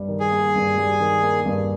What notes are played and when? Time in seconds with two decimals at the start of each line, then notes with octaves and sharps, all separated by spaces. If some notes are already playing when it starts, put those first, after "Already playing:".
Already playing: G2 G3
0.08 D#3
0.20 G#4
0.31 A#3
0.55 G2
0.77 G3
1.00 D#3
1.23 A#3
1.46 G2